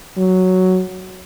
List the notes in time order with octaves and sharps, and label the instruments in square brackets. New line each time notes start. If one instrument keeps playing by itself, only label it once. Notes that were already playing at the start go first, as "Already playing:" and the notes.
[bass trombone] F#3